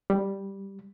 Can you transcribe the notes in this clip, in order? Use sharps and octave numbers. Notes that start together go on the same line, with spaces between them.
G3